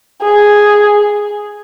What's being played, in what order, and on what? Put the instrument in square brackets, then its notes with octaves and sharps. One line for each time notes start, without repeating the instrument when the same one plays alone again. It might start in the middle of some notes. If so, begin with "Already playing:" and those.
[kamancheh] G#4